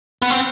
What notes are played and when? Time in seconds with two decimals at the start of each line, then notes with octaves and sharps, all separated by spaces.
0.22 B3
0.30 C4